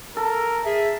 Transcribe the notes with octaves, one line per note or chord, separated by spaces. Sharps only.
A4 A#4
G#4 E5